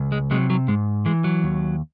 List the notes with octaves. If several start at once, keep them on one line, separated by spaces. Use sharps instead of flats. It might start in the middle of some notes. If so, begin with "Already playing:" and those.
Already playing: C#2
G#3
C3 F#3 G#3
F#3
G#2 G#3
E3 G#3
F#3
D#2